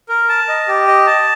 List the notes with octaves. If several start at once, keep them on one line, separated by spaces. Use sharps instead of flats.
A#4
A5
D#5
G4
D#5
A5